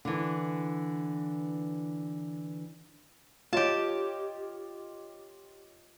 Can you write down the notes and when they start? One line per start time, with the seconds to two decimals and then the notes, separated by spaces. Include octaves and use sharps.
0.05 D3 E3
3.53 F4 G4 C#5 D#5 A5